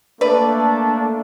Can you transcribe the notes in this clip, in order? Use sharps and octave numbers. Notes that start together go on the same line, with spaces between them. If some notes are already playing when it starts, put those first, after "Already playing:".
A3 A#3 D4 B4 D5